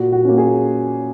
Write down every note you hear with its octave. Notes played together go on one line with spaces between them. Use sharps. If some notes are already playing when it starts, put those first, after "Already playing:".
Already playing: A#2 F#4
F#4
A#3 C#4
G#4